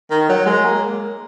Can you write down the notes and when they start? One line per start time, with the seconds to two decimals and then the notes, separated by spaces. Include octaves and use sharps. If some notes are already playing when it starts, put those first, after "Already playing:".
0.10 D#3
0.29 F#3
0.46 G#3
0.65 A#3